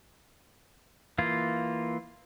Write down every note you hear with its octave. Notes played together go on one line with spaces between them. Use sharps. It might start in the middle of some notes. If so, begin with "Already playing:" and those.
E3 A#3 F4